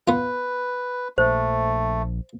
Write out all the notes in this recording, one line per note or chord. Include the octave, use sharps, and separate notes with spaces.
B3 F4 B4
A#1 A3 C5